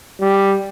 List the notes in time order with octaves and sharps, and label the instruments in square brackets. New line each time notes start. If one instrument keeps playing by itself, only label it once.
[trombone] G3